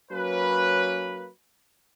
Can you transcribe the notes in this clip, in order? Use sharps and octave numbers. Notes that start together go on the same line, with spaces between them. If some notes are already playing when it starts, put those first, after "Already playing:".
F#3 A#3 C#4 B4